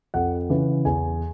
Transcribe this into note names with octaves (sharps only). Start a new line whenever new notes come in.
F2 F#5
C#3 E3
E2 G#5